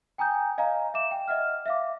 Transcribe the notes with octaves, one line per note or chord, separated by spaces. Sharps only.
G5 G#5 A#5 D#6 G6
D#5 F5 G#5 A#5
E5 D6 E7
G5
D#5 E5 F#5 F6
E5 F5 D6